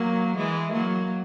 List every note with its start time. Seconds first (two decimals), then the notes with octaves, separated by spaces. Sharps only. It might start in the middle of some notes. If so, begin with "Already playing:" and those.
Already playing: F#3 A#3
0.37 E3 G#3
0.72 F#3 A#3